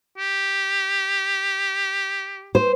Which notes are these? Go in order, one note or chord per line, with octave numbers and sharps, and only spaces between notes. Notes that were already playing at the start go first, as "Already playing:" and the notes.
G4
C5